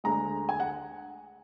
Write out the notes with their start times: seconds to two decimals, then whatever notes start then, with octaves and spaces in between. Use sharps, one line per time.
0.04 D2 D3 G#3 A#5
0.49 G#5
0.60 F#5